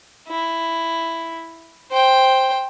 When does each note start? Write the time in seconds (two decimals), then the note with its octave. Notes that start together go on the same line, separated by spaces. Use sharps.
0.28 E4
1.91 C5 G5